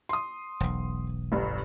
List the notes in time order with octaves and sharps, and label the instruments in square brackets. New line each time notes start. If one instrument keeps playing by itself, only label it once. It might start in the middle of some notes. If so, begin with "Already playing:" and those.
[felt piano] C6 D#6
[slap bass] E1 B1
[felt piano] G1 G2